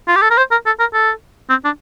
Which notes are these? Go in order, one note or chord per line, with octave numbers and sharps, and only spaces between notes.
F4
G4
A4
A#4
C5
A#4
A4
A#4
A4
C4
D4